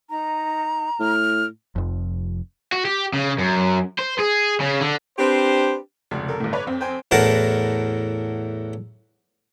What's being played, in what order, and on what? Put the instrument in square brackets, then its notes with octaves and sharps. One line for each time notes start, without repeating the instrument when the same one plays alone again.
[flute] D#4 [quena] A#5
[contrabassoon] A2 [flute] F6
[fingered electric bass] F1 F2
[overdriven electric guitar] F#4
G4
C#3
F#2
C5
G#4
C#3
D3
[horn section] C4 D4 G4 B4 C5
[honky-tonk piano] F1 [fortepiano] C#2
[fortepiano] A4 A#4
[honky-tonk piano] G1 A2
B4 C#5 D5
F2 C4
[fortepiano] C5 G5 G#5
[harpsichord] E2 A2 F#4 A#4 A5